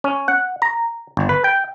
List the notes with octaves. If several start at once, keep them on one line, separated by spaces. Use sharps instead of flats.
C#4
F#5
A#5
G1
B4
G5